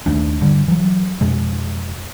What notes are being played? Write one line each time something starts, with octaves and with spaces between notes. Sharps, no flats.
D#2 D#3 A3 D4
G2 D3 G3
E3 F#3
F2 B2 G#3